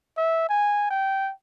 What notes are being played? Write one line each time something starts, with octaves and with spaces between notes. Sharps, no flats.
E5
G#5
G5